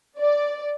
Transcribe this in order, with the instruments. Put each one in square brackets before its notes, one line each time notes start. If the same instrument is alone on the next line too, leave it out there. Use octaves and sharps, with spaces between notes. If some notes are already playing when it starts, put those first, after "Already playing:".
[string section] D5